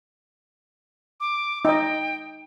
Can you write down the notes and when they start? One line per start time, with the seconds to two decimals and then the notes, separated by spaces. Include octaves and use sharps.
1.20 D6
1.65 D#4 D#5 G5